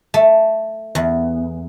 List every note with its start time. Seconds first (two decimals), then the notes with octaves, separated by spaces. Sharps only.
0.14 A3
0.95 E2